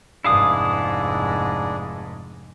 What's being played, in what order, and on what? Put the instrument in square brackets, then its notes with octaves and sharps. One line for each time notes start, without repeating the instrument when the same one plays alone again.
[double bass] F1 G#2 [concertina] D4 G#4 [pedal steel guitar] E4 F5 D#6